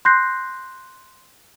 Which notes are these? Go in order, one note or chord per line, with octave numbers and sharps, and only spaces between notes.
C6 F#6 G6 A#6 C7